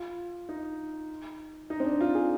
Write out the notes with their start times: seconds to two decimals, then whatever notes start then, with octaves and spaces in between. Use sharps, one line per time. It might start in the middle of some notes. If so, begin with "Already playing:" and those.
Already playing: F4
0.49 D#4
1.70 D#4
1.80 C4
1.85 D4
2.01 F4
2.15 G#4